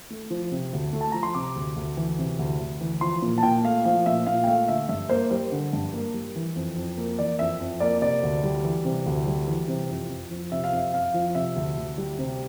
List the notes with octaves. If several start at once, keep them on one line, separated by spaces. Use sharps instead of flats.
A3
F3
C3
D2
A3
A5
F3 A#5
C6
C3 D6
D2
D2
E3
C3
D2
D2
E3
F3 C6
A#2
A5
A#2 G5
A3 F5
F3 F5
A#2 E5
A#2 F5
G5
A3 F5
D3 E5
G2 E5
A#3 C5
G3 C5
D3
G2
A#3
G3
E3
F2
F2
A#3
E3 D5
F2 E5
F2
A#3 D5
C3 D5
D2
G3
E3
C3
D2
G3
E3
C3
F2
F2
F3
C3 E5
F5
F2 E5
F2 F5
F3
C3 E5
D2
D2
G3
C3